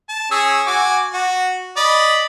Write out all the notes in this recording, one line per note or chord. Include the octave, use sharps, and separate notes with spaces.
A5
C#4 G#4 E6
F#4 G#5 D6
F#4
D5 D#5 B5